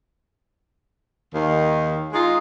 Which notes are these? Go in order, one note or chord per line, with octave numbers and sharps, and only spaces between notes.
D#2 D#3
G#3 D#4 F4